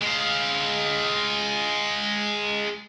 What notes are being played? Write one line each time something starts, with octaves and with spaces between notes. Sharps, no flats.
G#3 F5